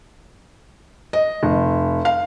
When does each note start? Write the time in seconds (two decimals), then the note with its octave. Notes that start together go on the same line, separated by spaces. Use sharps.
1.13 D#5
1.43 F1
2.05 F5